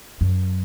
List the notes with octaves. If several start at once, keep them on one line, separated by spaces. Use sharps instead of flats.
F#2